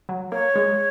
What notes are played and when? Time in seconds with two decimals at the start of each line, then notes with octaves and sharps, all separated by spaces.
0.09 F#3
0.32 A#3 C#5
0.56 G#3